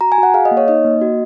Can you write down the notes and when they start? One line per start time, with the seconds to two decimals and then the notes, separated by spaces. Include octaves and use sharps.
0.01 F#4 A#5
0.12 G#5
0.18 F#4
0.23 F#5
0.34 G#4 F5
0.45 D#5
0.51 A#3
0.57 C#5
0.68 D#4 D#5
0.85 A#3
1.01 F#4